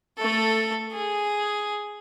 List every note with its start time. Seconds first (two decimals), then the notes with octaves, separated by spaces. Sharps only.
0.17 A3 A4
0.92 G#4